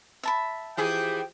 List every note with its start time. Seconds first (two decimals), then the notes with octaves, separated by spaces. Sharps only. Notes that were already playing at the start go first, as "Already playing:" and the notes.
0.23 E5 A5 B5
0.77 E3 F3 E4 G4 G#4 G5